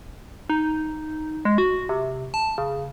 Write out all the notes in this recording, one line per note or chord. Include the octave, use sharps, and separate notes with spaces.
D#4
G#3
F#4
C3
A5
C#3